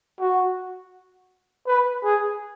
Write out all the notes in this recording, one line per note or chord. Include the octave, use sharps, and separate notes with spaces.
F#4
B4
G#4